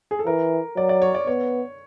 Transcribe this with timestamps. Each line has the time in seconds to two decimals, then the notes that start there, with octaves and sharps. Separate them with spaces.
0.11 G#4
0.19 A4
0.26 E3 A#4
0.76 F#3 D5
0.89 D5
1.02 C#5
1.15 D5
1.27 B3 C#5